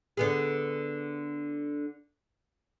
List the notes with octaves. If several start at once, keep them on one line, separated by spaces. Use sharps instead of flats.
D3 B3 G#4